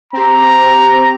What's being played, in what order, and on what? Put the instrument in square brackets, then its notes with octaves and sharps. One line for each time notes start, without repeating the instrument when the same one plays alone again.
[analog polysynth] C4 G4 [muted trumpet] A#5